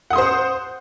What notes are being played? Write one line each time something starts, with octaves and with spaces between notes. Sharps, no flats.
C5 F#5 C6 D#6